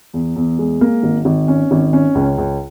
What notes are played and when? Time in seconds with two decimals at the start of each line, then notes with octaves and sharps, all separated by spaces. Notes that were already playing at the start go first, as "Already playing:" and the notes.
0.14 E2
0.36 E2
0.59 G#3
0.81 A#3
1.03 G#1
1.25 G#1
1.48 C#4
1.71 G#1
1.93 C#4
2.15 C#2
2.38 C#2